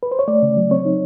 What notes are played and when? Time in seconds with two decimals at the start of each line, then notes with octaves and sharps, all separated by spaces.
0.03 B4
0.11 C5
0.19 C#5
0.28 A3 D5
0.42 C#3
0.57 F#3
0.71 C4 C#5
0.85 D#4